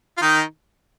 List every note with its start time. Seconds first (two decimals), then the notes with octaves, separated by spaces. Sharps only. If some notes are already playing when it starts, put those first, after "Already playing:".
0.17 F4
0.21 D#3 D#4